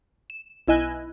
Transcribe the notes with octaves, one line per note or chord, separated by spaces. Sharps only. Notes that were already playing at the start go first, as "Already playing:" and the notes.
E7
B1 E4 D#5 G#5 F#6